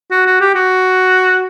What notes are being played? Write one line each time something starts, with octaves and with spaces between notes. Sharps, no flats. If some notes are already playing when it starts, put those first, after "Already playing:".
F#4
F#4
G4
F#4